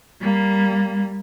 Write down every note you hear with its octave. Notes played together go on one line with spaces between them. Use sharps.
G3 A#3